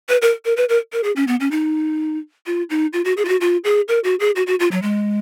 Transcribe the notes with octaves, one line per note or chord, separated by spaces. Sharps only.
B4
A#4
A#4
B4
A#4
A#4
G#4
C#4
B3
C#4
D#4
F4
D#4
F4
F#4
G#4
F4
F#4
F4
G#4
A#4
F#4
G#4
F#4
F#4
F4
F#3
G#3